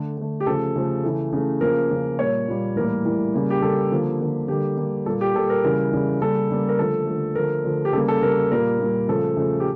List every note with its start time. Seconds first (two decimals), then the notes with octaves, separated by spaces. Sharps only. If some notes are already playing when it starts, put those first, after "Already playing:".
Already playing: D3 A3
0.17 D3 A3
0.40 G4
0.46 C#3 F3 A3 A4
0.76 C#3 F3 A3
1.04 C#3 E3 A3
1.32 C#3 E3 A3
1.61 C#3 F3 A#3 A#4
1.90 C#3 F3 A#3
2.19 A#2 G3 A#3 C#5
2.48 A#2 G3 A#3
2.76 A2 E3 G3 A#3 A#4
3.05 A2 E3 G3 A#3
3.34 C#3 G3 A#3
3.50 G4
3.62 C#3 G3 A#3 A4
3.91 D3 F3 A#3
4.20 D3 F3 A#3
4.48 D3 G3 A#3 G4
4.77 D3 G3 A#3
5.06 A#2 G3 A#3 A4
5.21 G4
5.35 A#2 G3 A#3 A4
5.50 A#4
5.64 C#3 E3 G3 A#4
5.92 C#3 E3 G3
6.21 C#3 G3 A#3 A4
6.50 C#3 G3 A#3
6.69 A#4
6.78 D3 F3 A3 A4
7.07 D3 F3 A3
7.35 D3 F3 A3 A#4
7.64 D3 F3 A3
7.85 G4
7.93 C#3 G3 A#3 A4
8.08 A4
8.22 C#3 G3 A#3 A#4
8.51 A#2 G3 A#3 A#4
8.80 A#2 G3 A#3
9.08 C#3 F3 A3 A4
9.37 C#3 F3 A3
9.60 G4